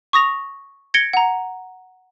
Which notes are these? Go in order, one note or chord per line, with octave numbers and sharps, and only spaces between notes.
C#6 D#6 A#6 F7
G#6 A#6 C#7 D7 G7
F#5 A#5